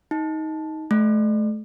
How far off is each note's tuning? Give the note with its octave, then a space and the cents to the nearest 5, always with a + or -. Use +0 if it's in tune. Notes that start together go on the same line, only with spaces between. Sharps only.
D#4 +15
A3 -35